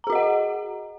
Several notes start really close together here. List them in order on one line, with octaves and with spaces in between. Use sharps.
A#5 G#4 F#4 D#5 F#5